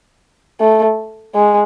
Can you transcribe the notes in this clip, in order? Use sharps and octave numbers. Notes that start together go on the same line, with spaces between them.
A3
G#3